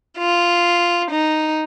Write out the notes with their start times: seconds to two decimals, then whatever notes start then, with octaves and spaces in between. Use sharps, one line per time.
0.18 F4
1.11 D#4